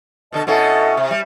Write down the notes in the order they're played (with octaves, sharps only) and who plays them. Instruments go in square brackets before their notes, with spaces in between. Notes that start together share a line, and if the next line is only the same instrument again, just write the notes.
[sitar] B2 D3 A4 [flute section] D#5 A5
[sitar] B2 C#4 E4 [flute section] A4 D#5 F#5
[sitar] C3
G3